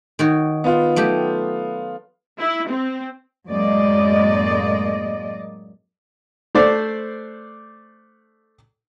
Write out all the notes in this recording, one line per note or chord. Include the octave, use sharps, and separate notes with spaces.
D#3 F#4 C#5
B3 F4
F#3 A3 G4
E4
C4
F#2 A2 G#3 A#3 D5 D#5
A3 D4 C5 D5